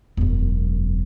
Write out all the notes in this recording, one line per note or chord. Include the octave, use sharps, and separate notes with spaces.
E1 F#2